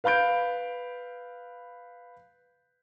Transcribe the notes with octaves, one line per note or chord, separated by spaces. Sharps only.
B4 F5 B5 G6 D7